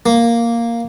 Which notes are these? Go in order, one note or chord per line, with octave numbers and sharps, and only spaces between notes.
A#3